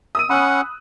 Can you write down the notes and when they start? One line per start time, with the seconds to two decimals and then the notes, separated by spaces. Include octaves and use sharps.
0.15 D#6 E6 D#7
0.30 C#4 F#5 B5 E6 F#6